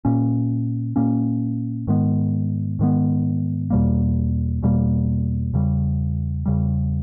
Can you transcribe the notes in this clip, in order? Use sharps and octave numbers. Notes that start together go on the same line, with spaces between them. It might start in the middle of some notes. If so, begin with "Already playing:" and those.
A#2 A#3 C#4
A#2 A#3 C#4
G#2 D#3 G#3 B3
G#2 D#3 G#3 B3
E2 B2 G3 A#3
E2 B2 G3 A#3
E2 C#3 G3
E2 C#3 G3